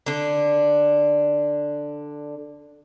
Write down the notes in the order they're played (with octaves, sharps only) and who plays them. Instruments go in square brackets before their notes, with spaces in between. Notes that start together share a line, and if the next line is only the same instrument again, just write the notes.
[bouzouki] D3 D4